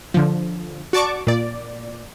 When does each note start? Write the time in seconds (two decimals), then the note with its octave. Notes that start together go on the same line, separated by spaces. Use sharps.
0.14 D3 F3
0.93 F#4 D5 A5 C#6 D6
1.27 A#2 D5